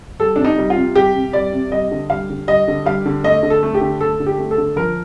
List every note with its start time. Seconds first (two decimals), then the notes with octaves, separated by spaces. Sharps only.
0.20 G3 A4
0.36 C3 D4
0.45 D#4
0.58 G3
0.70 F4
0.77 C3
0.95 G3 G4
1.16 C3
1.33 G3 D5
1.53 C3
1.72 G3 D#5
1.91 D3
2.10 G3 F5
2.30 D3
2.48 G3 D#5
2.68 D3
2.86 G3 F5
3.06 D3
3.24 A3 D#5
3.43 D3
3.50 A4
3.63 A3
3.75 G4
3.81 D3
4.00 A3 A4
4.20 D3
4.27 G4
4.38 A3
4.51 A4
4.58 D3
4.76 F3 A#4